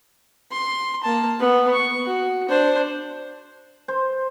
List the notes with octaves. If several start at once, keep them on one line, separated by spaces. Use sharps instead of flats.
C6
A#3 A5
B3
C#6
F#4
D4 C5
C5